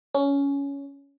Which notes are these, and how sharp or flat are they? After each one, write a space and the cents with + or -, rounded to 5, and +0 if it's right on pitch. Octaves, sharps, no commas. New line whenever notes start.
C#4 +15